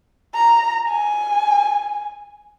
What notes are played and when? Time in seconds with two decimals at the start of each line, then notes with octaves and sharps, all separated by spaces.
0.35 A#5
0.88 G#5